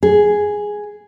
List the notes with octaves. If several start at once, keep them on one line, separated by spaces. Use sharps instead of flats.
G#4